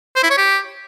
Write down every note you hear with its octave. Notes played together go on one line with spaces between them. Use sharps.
C5
E4
C#5
G4